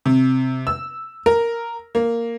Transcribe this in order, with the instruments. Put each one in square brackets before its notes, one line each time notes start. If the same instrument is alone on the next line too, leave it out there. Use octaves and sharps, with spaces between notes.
[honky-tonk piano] C3
E6
A#4
A#3